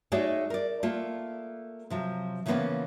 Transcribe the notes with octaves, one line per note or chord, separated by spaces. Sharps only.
A3 D#4 F#4 G#4 C#5 D5
A#4 D5
A3 A#3 F4
C3 F3 F#3
C#3 E3 F3 A#3 B3 C#4